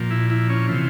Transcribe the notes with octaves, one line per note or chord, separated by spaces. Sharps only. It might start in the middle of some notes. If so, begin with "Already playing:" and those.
Already playing: A#2 F3
E4
E4
C#4
C3 E3 F4